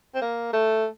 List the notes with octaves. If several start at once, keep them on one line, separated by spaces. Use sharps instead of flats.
C4
A#3
A3